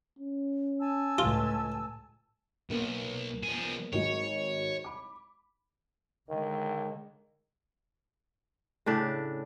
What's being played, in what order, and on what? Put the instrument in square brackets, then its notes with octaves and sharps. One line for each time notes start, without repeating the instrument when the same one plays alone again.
[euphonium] C#4
[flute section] G#5 A5 E6
[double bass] C#2 A2 [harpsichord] F4
[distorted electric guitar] B1 [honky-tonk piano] A#3 B3
[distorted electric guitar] F3 G#4
[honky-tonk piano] G#1 F#3 G#3 [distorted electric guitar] C#5
[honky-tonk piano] B5 D6
[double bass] D3 G#3 [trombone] D#3
[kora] A2 C#3 D4